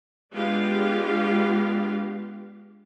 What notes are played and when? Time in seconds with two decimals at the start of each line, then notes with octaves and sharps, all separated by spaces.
0.33 G#3 B3 D4 F4 G4 F5